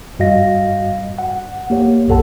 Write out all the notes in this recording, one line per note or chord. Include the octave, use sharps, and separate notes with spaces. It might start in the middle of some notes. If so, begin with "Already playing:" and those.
G2 G3 F#4 D#5 F5 A#6
F#5
A#3 G4 C#5
B1 G2 A4 F#5 A5